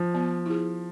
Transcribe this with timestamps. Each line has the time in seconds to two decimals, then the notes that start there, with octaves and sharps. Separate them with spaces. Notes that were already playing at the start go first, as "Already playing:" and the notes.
Already playing: F3
0.14 B3
0.46 E4 G#4